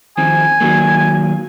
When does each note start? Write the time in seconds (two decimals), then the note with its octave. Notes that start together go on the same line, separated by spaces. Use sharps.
0.18 D#3 F3 C4 G#5
0.61 D#3 F#3 A#3